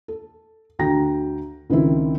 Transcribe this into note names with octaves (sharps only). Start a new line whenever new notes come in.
A4
D2 D3 F#4 G5 A#5 A#6
C#2 D#3 F3 C4 E4